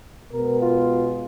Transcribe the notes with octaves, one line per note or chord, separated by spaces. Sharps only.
B2 G#3 B3 A#4
F4